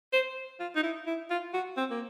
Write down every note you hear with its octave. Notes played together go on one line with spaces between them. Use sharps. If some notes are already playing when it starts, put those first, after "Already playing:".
C5
F4
D#4
E4
E4
F4
F#4
C4
A#3